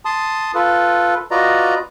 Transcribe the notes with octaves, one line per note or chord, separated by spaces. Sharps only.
A5 C6 D#6
F4 A4 B4
F4 F#4 B4 D5 D#5 A#5